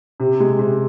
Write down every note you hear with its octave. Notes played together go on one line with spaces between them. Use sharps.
C3
G#3
C3